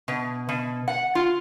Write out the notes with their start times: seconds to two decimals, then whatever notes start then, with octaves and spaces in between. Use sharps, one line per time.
0.08 B2
0.49 B2
0.88 F#5
1.15 F4